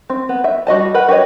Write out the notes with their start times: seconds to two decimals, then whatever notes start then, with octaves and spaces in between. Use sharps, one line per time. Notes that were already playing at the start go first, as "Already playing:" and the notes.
0.10 C4
0.29 B3
0.44 E5
0.67 G3 F#4 D#5 A5
0.94 A#4 B4 F#5
1.09 F#4 G4 B4 C#5 D#5